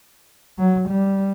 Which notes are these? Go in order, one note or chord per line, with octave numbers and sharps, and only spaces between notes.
F#3
G3